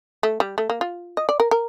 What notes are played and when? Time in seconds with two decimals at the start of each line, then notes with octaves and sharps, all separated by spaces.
0.23 A3
0.40 G3
0.58 A3
0.70 A#3
0.81 F4
1.17 D#5
1.29 D5
1.40 A#4
1.51 A#4